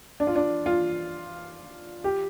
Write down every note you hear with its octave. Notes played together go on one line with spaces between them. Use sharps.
D4
F4
D4
F4
G4